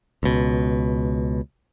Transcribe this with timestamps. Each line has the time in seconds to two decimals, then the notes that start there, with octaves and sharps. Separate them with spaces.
0.23 C#2 B2